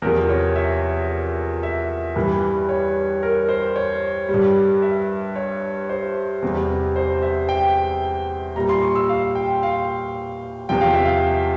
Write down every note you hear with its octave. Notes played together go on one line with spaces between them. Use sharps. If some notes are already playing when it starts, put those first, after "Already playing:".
E2 C3 F3 A#4
C#5
E5
E5
G2 E3 G3
C#5
A#4
C5
C#5
G3
G2
E5
C#5
C5
E2 C3 G3
C5
E5
G5
A#2 G3 A#5
C6
C#6
E6
F5
G5
F5
E2 C3 F3 G5
F5
E5
F5